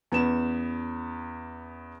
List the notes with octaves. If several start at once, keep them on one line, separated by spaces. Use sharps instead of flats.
E2 B3 C#4 E7